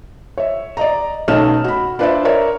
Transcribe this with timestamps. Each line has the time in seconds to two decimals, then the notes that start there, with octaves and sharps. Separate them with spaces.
0.38 C#5 E5
0.77 D5 D#5 A#5
1.28 B1 A3 C#4 D#4 F6 E7
1.64 F#4 B5
1.99 D4 F4 B4 C5 D5 E5
2.25 A#4 C#5 D5 E5